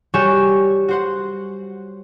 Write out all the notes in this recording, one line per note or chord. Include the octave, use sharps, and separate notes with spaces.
G3 F#4 C#5 G#5 G6 E7
F#4 C5 F#5